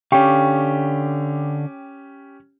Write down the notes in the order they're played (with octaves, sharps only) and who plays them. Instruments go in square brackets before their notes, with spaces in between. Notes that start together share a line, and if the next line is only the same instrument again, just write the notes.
[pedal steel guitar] D3 F5 C#6 [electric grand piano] C#4 G4 [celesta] G5